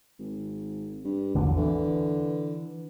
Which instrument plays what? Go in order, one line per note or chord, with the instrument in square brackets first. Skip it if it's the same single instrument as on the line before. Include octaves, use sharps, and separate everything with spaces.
[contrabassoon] G#1
G2
[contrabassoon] D1 [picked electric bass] A1 E2 D3
[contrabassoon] D3 [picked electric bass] E3